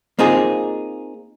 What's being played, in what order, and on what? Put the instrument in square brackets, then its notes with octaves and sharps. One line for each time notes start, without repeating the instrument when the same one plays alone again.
[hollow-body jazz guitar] A#3 C4 D#4 F4 G#4